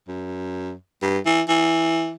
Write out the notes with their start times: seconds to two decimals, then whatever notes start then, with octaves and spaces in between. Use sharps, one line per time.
0.08 F#2
1.02 G2
1.26 E3
1.48 E3